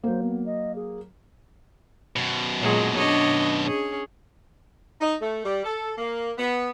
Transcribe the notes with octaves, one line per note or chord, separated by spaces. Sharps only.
F#3 A#3 C5
B3
D#5
G#4
F#2 B2
A#2 F#3 G#3
D4 C#5 D#5
C#4 G#4
D#4
A3
G3
A4
A#3
B3